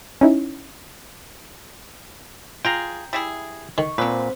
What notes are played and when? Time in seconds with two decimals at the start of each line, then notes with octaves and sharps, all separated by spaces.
0.21 C#4 D#4 E4
2.65 F4 G#4 G5 A#5
3.13 G3 E4 G#4
3.78 D#3 C#6
3.98 A#2 D3 C4 B4 C5